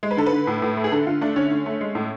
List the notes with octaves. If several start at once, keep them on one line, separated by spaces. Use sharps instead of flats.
G#3
B4
D3 A4
B4
D3
A2
A2
A3
G#4
D3 A4
D3 F4
A3 D4
D3 C#4
D3
A3
G#3
A2